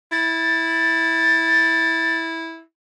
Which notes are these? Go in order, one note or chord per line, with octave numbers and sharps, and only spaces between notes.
E4 A6